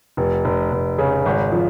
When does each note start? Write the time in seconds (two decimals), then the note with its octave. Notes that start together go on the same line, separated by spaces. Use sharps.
0.17 F1
0.45 F1
0.72 F1
0.98 C#3
1.26 G#1
1.52 F3